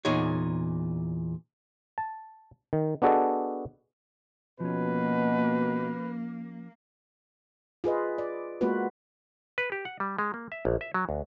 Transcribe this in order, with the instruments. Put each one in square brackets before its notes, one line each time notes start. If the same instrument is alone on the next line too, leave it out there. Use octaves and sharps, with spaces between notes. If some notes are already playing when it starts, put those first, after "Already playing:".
[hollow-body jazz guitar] E2 A#2 D#4 G#4 C#5
[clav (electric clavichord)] A5
D#3
B3 D4 F#4 G#4 A4 D#5
[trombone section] B2 [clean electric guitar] F3 C#4 [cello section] A#3 [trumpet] B4
[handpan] F4 G#4 B4 D#5
D5
G#3 A#3 B3 F4 F#4 B4
[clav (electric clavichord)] B4
G4
F#5
G3
G#3
A#3
E5
A#1
E5
F#3
D2